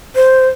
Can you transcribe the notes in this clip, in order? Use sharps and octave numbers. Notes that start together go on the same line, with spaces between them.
C5